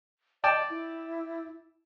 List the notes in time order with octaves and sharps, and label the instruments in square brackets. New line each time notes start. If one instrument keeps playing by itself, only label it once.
[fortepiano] D5 G5 A5 [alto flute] D#5
[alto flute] E4